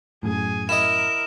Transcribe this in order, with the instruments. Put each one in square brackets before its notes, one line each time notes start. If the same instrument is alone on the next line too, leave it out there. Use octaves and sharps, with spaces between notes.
[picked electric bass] F#2 A2 [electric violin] G#4 G#5
[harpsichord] E4 D#5 [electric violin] A#4 [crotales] E7